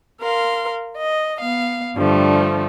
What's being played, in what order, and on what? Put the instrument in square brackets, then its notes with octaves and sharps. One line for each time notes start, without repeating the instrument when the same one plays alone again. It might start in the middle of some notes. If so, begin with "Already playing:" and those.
[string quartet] A#4 F5 C6
D#5
B3 F5
G2 D3 F3 G3 A3